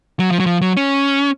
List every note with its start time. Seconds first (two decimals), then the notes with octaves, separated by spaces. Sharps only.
0.19 F#3
0.31 F3
0.40 F#3
0.46 F3
0.61 F#3
0.77 C#4